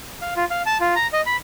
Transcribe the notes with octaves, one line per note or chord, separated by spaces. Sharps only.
F5
F4
F5
A5
F4
A#5
D#5
B5